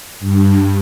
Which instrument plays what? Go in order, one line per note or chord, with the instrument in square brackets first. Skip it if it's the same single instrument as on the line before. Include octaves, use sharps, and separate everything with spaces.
[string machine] G2